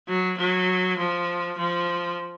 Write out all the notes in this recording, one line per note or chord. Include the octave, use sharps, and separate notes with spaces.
F#3
F#3
F3
F3